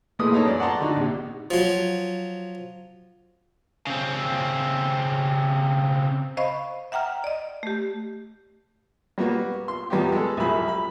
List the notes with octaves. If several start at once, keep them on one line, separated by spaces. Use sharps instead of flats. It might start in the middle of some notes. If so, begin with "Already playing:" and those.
A#2 G#3 A3 E4 B4 D#6
A#3 B3 D#4 A4 C#5
F#2 D5
D5 F#5 A5 A#5 C6 C#6
D3 D#4 F#4
A#1 C3
F3 F#3
C#3 C4
C5 D#5 F5 B5 C#6
E5 F#5 G5 A#5 F6
D5 D#5
A3 G4
G3 A#3 B3 F#4
C6
E2 G3 B3 F#4 G4
G#3 A4
C2 F#2 F3 G#4 B5
B5